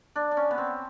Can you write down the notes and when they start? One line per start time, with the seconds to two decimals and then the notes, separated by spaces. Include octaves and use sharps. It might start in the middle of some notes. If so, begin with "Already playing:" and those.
0.16 D4
0.31 D4
0.37 C#4
0.51 B3
0.58 C4